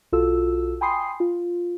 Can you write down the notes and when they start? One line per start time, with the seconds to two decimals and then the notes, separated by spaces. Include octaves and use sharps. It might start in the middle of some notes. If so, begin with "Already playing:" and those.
0.12 B1 F4 F#4 A4 E6
0.81 G5 G#5 B5 C6 D#6 C7
1.20 F4